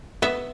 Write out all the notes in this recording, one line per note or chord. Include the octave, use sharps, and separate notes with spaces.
B3 E5